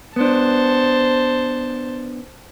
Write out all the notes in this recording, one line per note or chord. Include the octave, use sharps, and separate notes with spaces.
B3 D4 C5 A5